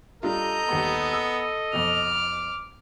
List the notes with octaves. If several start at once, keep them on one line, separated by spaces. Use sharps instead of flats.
G3 D4 F4 A4 D#5 A#5 G6
D#2 G3 B3 B5
E6
F2 B2 D6 F6